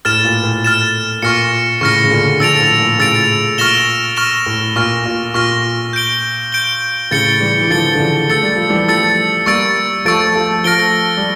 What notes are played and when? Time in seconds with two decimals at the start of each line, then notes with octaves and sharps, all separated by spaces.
0.05 A2 F6 A6 E7
0.25 A#2
0.44 A2
0.64 F6 A6 E7
1.22 A#2 C#6 F6 A#6 C#7
1.81 A2 C#3 C#6 F6 A#6 C#7
2.04 C#3
2.11 A#2 D3
2.40 D3 F3 E6 A6 D7 F7
2.60 A2
2.79 A#2
2.99 A2 C#3 E6 A6 D7 F7
3.58 A#2 C#6 F6 A#6 E7 G7
4.17 C#6 F6 A#6 E7 G7
4.46 A2
4.76 A#2 C#6 F6 A#6
5.06 A#2
5.34 A#2 C#6 F6 A#6
5.93 G6 D7 G7
6.52 G6 D7 G7
7.11 A2 C#3 A6 C#7 G7
7.40 E3 G3
7.61 E3
7.70 D3 F3 A6 C#7 G7
7.95 D3
7.99 C#3 E3
8.29 A3 E6 A6 C#7
8.43 G3
8.56 F3
8.70 E3 G3
8.88 F3 A3 E6 A6 C#7
9.46 G3 A#3 C#6 E6 A6 D7
10.05 F3 A3 C#6 E6 A6 D7
10.35 F3 A3
10.64 F3 A3 F6 A#6 D7 G7
11.17 G3